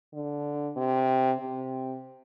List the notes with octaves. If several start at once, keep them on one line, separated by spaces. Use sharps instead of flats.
D3
C3
C3